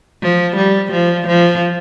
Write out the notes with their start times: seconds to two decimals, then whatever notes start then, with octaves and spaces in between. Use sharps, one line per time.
0.22 F3
0.56 G3
0.92 F3
1.27 F3